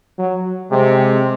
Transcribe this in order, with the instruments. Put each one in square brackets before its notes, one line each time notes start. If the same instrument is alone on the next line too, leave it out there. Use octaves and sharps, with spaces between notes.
[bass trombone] F#3
[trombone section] C3 [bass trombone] G#3